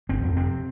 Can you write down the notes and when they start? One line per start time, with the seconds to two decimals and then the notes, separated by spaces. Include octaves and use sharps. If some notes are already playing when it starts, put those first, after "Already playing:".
0.09 G1 C4
0.23 F2
0.36 C3 C4